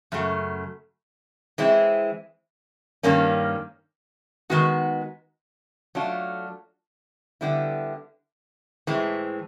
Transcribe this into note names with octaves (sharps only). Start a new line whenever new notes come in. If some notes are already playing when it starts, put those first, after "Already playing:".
F#2 C#3 F#3 A3
E3 G#3 C4 E4
G2 D#3 G3 A#3 C#4
D#3 G#3 B3 D#4 F#4
F#3 A3 D4 F4
D3 G3 B3 E4
A2 E3 G#3 C4